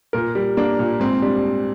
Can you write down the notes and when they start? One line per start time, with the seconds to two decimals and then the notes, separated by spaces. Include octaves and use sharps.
0.13 A#2 A#4
0.35 G3
0.57 A#3 D4
0.79 A#2
1.00 G#2 C4
1.22 G3 D4